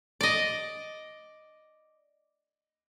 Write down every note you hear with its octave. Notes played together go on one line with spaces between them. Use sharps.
D5 D#5